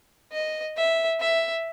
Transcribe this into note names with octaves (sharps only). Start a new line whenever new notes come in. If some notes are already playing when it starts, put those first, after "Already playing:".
D#5
E5
E5